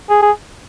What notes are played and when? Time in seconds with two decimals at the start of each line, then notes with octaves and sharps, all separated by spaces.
0.09 G#4
0.22 G#4